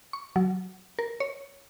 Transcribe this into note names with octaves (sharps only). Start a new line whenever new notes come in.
C#6
F#3
A#4
C#5